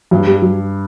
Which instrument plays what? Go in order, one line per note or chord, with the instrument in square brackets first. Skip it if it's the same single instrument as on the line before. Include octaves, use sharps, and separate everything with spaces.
[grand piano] G2 [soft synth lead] F#3
[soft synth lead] G3
F#3